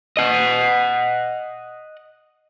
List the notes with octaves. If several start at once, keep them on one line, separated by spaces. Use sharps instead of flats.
D#5 F#5